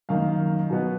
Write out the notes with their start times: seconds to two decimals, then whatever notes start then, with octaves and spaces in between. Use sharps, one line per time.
0.09 F#2 D#3 A#3 F5
0.70 B2 F#3 B3